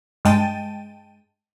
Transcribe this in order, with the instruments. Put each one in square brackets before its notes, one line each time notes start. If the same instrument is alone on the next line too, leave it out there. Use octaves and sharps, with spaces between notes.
[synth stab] G2 G#3 G5 A5 A6 D#7